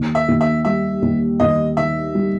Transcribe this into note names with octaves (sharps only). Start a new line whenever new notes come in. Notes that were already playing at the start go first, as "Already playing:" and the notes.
Already playing: D#2
E5
D#2
E5
G3 E5
D#2
D#2 D#5
D#3 E5
G3